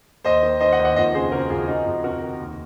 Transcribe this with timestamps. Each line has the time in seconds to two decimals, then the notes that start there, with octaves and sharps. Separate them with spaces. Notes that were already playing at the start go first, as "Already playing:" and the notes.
0.24 D#2 C5 D#5
0.42 D#3
0.60 D#3 C5 D#5
0.72 D#5 F#5
0.79 D#2
0.85 D#5 F#5
0.96 F2 C5 D#5
1.14 C#3 G#4 C5
1.32 C#3 F#4 A#4
1.50 F2 F4 G#4
1.68 F2 D#4 F#4
1.86 F2
2.04 C3 F#4 A#4
2.21 D#3
2.40 D#2